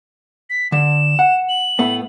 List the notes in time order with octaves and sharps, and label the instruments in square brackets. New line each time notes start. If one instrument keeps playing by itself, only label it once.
[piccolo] B6
[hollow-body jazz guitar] D3 [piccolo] E7
[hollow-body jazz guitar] F#5
[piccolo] F#7
[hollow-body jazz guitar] A2 A3 B3